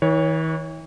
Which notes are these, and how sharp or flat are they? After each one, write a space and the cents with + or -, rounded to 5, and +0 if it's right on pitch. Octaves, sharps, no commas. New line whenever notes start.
E3 -45 C#5 +0